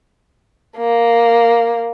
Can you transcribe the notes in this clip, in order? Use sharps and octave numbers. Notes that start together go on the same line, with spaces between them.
A#3